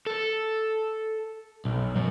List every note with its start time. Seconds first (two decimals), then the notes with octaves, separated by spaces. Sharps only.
0.06 A4
1.65 B1
1.96 F#2 F#3